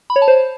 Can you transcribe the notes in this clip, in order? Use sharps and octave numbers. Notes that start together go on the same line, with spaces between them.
B5
C#5
A5
C5